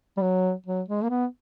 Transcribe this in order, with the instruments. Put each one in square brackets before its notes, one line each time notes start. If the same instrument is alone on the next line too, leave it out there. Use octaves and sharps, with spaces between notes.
[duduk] G3
F#3
F#3
G#3
A#3
B3